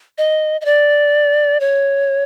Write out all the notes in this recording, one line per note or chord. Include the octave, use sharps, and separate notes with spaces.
D#5
D#5
D5
C#5